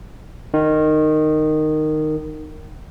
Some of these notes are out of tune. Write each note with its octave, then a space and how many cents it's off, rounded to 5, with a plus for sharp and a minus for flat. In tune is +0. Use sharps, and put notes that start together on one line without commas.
D#3 -15